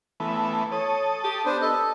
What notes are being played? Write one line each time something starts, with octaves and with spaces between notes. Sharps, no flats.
E3 A3 B3
A4 C#5 D#6
G4
B3 D4 C5
A4 D#5